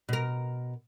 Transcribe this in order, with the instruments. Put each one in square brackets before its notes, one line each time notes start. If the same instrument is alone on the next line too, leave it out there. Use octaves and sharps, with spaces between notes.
[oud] B2 A#4